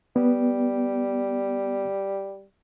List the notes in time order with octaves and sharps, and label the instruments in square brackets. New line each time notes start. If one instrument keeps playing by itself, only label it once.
[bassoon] G3 [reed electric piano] B3